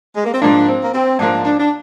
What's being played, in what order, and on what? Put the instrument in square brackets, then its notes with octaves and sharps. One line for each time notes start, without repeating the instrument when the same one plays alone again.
[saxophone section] G#3
A#3
C4
[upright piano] G#2 F3 A#3 [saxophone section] D4
[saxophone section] C4
A#3
C4
[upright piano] G#2 F3 A#3 [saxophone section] D4
[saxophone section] D4
D4